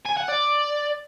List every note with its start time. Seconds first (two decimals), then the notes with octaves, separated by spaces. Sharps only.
0.05 G#5
0.17 F#5
0.28 D5